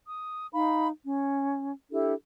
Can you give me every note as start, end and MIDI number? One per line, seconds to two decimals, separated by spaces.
0.06 0.48 87
0.54 0.89 63
0.54 0.89 77
0.54 0.89 83
1.05 1.71 61
1.92 2.14 62
1.92 2.14 64
1.92 2.14 67
1.92 2.14 69